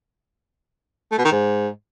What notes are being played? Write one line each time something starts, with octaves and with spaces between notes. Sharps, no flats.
A3
B2
D#3
G#2